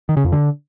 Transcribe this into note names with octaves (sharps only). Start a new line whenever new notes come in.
D#3
C#3
F2
D3